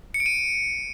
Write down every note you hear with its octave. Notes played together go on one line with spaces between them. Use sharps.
C#7
D7
D#7